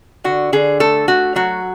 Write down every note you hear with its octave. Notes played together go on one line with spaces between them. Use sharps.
D3 F#4
D3 G#4
A3 A4
A3 F#4
F#3 F#4